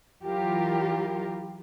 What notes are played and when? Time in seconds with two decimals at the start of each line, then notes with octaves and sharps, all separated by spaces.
0.25 E3 F#3 E4 F4 G4 A#4